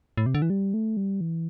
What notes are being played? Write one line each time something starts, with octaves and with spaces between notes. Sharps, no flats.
A2
C3
D3
E3
G3
A3
G3
E3